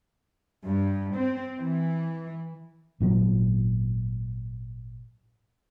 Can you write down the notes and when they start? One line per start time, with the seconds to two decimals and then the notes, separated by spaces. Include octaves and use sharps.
0.65 G2
1.15 C4
1.59 E3
3.00 G#1 A#2 D3 F#3